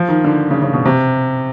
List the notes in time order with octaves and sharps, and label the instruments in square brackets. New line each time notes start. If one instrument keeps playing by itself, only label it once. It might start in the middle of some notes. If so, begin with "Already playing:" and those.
Already playing: [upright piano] F3
D#3
D3
C#3
C#3
B2
C3